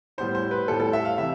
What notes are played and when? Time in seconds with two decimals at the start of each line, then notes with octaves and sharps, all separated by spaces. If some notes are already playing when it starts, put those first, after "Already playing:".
0.18 A2 G3 B3 E4 C5
0.35 C5
0.51 B4
0.68 A2 G3 B3 E4 A4
0.80 A4
0.93 E5
1.05 F5
1.18 C3 E3 E5